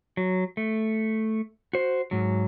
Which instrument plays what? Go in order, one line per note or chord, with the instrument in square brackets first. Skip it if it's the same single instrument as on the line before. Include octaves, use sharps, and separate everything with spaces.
[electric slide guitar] F#3
A3
F#4 C5
G#2 F#3